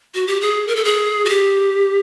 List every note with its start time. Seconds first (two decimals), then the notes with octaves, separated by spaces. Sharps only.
0.14 F#4
0.27 G4
0.41 G#4
0.67 A#4
0.76 A4
0.84 G#4
1.25 F#4
1.29 G4